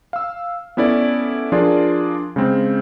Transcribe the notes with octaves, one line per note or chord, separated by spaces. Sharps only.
F5 E6
B3 C#4 E4 A4 D5
F3 D4 F4 G#4 A#4 D5
C#3 G#3 C4